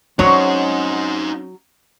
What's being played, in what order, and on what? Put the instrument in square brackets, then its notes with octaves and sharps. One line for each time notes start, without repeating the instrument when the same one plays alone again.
[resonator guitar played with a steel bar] F#3 C#5 [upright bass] C4 C#4 [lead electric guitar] D#4 C5